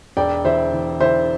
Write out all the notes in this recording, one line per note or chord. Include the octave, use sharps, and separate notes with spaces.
E1 D5 G5
E3 C5 E5
E3
E3 C5 E5